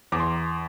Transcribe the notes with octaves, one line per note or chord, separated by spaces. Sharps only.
E2 D6
C6